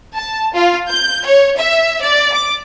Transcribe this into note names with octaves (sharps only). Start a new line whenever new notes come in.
A5
F4
G6
C#5
E5
D5
D6